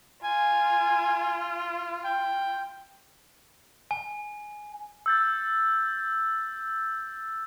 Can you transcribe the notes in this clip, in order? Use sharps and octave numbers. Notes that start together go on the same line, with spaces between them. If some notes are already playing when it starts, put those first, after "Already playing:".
F4 G#5
G5
G#5
E6 G6 A6